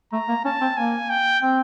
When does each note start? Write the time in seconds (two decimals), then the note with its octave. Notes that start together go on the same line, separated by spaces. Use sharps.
0.12 A3 A#5
0.29 A#3
0.45 C#4 A5
0.61 C4
0.77 A#3 G#5
1.10 G5
1.42 C4